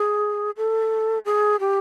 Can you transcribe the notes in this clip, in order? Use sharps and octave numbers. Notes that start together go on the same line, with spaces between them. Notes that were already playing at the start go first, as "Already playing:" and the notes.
Already playing: G#4
A4
G#4
G4